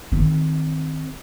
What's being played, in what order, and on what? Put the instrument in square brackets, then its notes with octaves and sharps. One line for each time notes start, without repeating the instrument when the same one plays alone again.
[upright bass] D#3 C4